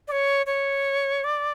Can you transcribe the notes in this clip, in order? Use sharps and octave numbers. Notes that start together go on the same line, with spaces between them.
D5
C#5
C#5
D5